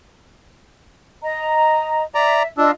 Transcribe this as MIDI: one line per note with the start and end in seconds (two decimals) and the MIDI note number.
1.23 2.03 75
1.23 2.03 82
2.15 2.43 74
2.15 2.47 76
2.15 2.43 82
2.58 2.71 62
2.58 2.70 65
2.58 2.70 75
2.58 2.70 88